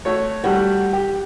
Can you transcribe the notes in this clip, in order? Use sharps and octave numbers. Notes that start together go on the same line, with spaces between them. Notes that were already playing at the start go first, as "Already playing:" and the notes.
A3 F#4 C#5
G3 A3 F#4
G4